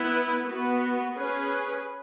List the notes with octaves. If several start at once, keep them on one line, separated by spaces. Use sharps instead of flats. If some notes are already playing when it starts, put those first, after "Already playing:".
Already playing: B3 E4 B4
B3 F#4 B4
C#4 G#4 B4